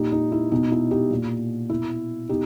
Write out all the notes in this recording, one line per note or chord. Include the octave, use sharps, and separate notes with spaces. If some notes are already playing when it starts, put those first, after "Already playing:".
Already playing: A#2 D#4 G4
D#4
E4
B2 D#4
E4
D#4 G4
A#2
B2 E4
B2 D#4 G4